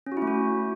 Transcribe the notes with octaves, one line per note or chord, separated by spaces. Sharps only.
C#4
F#4
E4
A3
F#4